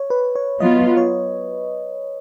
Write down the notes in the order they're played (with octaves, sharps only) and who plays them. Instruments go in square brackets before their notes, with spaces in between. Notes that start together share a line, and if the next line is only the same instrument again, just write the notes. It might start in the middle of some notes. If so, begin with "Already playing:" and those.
Already playing: [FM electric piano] C#5
B4
C#5
[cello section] F#3 B3 F4 [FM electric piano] D#5
[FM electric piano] C#5